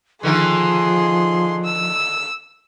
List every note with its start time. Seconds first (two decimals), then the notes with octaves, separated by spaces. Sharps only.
0.23 D3 D#3 F3 A#3 G#4 C6
1.64 E6